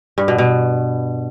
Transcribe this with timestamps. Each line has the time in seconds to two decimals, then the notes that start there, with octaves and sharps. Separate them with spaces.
0.18 G2
0.28 B2
0.38 B2